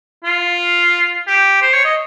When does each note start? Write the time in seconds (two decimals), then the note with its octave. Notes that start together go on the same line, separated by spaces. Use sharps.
0.24 F4
1.27 G4
1.62 C5
1.73 C#5
1.85 D#5